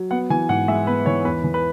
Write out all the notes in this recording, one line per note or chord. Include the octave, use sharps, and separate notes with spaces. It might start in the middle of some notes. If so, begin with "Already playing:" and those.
Already playing: F#3
B3 F#5
E3 G#5
G#2 F#5
G#3 E5
B3 B4
E3 C#5
E2 B4
E3
B4